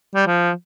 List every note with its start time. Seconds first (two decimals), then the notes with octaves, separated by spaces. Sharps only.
0.15 G3
0.27 F3